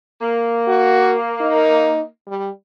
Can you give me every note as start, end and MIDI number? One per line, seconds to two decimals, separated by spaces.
0.21 2.05 58
0.67 1.15 66
1.41 2.02 63
2.27 2.49 55